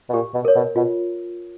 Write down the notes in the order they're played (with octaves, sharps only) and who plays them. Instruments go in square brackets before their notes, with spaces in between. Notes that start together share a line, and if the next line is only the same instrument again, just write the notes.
[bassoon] B2
[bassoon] A#2 [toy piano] G4
[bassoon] B2
[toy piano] A#4 C#5
[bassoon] B2
[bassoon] B2 [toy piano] F4